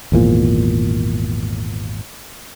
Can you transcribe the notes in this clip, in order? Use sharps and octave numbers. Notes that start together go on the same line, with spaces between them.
G#1 E2 A#2 F3